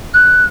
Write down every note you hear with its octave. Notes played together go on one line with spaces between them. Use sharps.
F#6